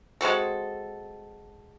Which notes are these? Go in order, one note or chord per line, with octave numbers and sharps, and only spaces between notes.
G#3 C4 F#4 A4